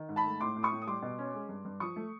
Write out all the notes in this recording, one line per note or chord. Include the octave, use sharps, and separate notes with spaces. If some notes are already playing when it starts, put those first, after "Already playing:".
Already playing: D#3
G#2
A5 B5
A3
A2 C6 D6
A2
C#6 D#6
A2
D#6
G3 C6 D6
B2
C#4
G#3
G2
G2
F3 C#6 D#6
A3